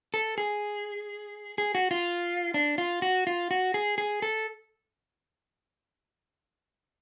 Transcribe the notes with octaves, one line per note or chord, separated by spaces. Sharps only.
A4
G#4
G#4
F#4
F4
D4
F4
F#4
F4
F#4
G#4
G#4
A4